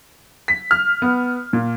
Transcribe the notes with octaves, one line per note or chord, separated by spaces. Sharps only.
B6
F6
B3
A#2